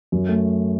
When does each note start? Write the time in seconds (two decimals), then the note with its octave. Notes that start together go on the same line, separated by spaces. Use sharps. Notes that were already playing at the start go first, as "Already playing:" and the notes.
0.12 F#2
0.28 A3